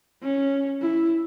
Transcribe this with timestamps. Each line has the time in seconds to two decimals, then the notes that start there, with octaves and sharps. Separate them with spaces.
0.22 C#4
0.82 E4